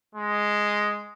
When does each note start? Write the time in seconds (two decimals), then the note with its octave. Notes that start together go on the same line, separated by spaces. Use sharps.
0.15 G#3